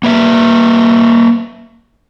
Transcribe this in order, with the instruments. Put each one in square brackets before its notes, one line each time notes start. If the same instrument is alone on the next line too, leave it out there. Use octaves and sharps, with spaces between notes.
[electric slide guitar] A#3 B4 E5